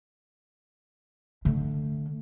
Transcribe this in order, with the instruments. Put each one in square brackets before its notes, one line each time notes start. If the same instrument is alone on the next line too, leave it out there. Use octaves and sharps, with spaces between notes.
[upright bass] D3 A3